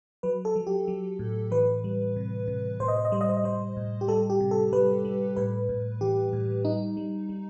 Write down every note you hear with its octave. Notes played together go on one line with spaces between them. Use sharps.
F#3 B4
A4
F#3
G4
F#3
A2
E3 B4
G3
C3
C3
A2 C5
D#5
C5
D#5
G3 C5
D#5
C5
D#5
G3 C5
A2
G4
G3 A4
G4
C3
A4
G3 B4
G3
A2 B4
A2
E3 G4
A2
G3 D#4
G3
G3